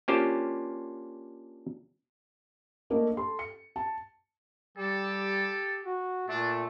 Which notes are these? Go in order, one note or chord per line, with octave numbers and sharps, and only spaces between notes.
A#3 C#4 D4 F4 G4 C5
A3 A#3 D4 A#4 D#5
A4 C6
C#7
A5
G3 G4 A4
F#4
A#2 A3 D4